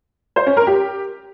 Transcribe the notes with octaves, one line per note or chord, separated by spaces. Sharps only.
C5
C#4
A#4
G4